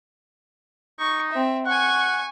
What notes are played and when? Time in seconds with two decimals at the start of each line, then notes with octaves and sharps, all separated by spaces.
0.99 D#4 C#6
1.31 C4 E5
1.66 F#5 G#5 C#6